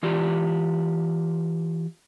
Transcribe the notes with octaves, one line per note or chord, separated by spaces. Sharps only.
E3 F4 G4 D5